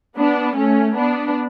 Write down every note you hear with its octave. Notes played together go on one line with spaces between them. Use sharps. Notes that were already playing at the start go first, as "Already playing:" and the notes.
B3 D4
A3 C#4
B3 D4